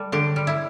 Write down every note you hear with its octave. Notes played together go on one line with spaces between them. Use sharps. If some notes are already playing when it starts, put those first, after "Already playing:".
Already playing: G3 A4
D3 G4
G3
E4